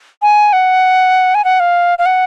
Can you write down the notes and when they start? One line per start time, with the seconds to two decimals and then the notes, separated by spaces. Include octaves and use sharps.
0.22 G#5
0.53 F#5
1.35 G#5
1.45 F#5
1.60 F5
1.99 F5
2.06 F#5